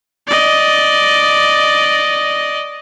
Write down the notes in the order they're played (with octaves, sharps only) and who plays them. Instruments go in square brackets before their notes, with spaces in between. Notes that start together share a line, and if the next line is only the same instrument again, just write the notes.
[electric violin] D5 D#5